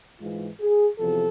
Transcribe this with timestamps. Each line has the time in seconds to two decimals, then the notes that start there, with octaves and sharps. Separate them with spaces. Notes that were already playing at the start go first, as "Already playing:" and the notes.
0.20 G#2 E3 G#3 F4
0.59 G#4
0.98 E2 C3 F3 A4